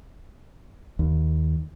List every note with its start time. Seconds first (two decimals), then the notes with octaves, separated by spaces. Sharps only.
0.99 D#2